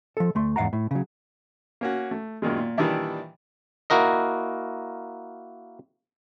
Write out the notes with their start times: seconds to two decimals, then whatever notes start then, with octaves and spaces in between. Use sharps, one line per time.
0.17 F3 A4
0.35 D2 A3 C6
0.56 E2 G#2 F5 F#5 A#5
0.73 A2
0.91 C#3 F#3
1.81 A#3 C#4 F#4
2.11 A3
2.42 F#2 A#2 D#3 G#3
2.58 A#2
2.78 A#2 D#3 E3 G3 D4 E4
3.90 A#3 E4 F#4 A#4 D#5